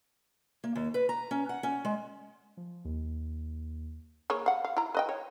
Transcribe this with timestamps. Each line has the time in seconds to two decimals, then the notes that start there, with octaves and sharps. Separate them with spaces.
0.64 A#3
0.76 D#2
0.94 B4
1.09 A#5
1.31 C#4
1.49 F#5
1.63 C#4
1.85 G#3
2.57 F3
2.85 D#2
4.30 A#3 G#4 C#5
4.46 F5 F#5
4.65 F5
4.77 E4 A#5
4.95 B4 D#5 G5
5.09 C#5